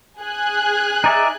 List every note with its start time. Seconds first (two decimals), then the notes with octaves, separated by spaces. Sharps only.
0.22 G#4 G#5 F#6
1.04 D#4 D5 E5